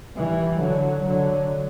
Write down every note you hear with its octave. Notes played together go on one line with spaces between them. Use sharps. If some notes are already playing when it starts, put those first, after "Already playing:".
E3 G3
D3 F#3
D3 F#3